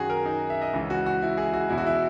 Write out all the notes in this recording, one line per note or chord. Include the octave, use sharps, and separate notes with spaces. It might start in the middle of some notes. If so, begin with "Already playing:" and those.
Already playing: F#2 D#3 F#4 G#4
A#4
D#4
E5
D#5
C#2 C#3 E3
F#4
F#4
E4
G#4
F#4
E2 B2 E4
F#4
E4